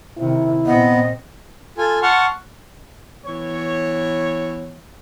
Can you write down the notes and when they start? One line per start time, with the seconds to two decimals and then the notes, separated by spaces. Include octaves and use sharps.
0.18 C3 D#3 E4
0.66 A#2 B3 C4 D#5
1.78 F4 A4 G#5
2.02 F#5 A5 C6 C#6 F6
3.26 E3 B3 C#5